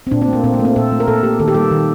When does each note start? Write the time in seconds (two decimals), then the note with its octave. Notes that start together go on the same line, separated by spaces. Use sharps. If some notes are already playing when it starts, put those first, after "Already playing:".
0.07 C4
0.11 A#2 D4
0.22 C4
0.28 A3 A#3
0.44 A#2 C4
0.54 A#3
0.60 A3
0.65 C4
0.76 A#2 A4
0.92 A3
1.00 A#4
1.08 A#2 A4
1.23 A3 G4
1.40 D#3 A4
1.48 G4
1.55 G3 A#3 A4
1.71 D#3